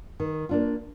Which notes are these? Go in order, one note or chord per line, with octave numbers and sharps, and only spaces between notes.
D#3
A#3 D4 F4